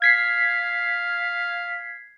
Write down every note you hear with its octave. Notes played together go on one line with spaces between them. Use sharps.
F5 G#6 B6 C7